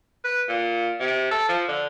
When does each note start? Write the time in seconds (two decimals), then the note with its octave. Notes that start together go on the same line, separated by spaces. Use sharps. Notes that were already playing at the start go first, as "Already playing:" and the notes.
0.24 B4
0.49 A#2
1.00 C3
1.31 A4
1.49 F3
1.68 D3